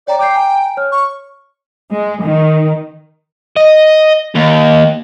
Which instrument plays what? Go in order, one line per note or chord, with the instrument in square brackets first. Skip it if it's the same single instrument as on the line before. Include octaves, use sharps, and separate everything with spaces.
[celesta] C#5 G5 A#5 [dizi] D5
[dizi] G5 [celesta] D6 G6 C7
[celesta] G#5 A#5
C#5 F6
[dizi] C#6
[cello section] G#3
D#3
[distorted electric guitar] D#5
D#2